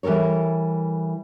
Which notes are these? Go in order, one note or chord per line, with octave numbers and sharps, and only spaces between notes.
E3 G3 A4 A#4 C#5